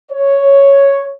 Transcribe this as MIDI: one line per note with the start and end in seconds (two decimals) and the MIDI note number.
0.12 1.11 73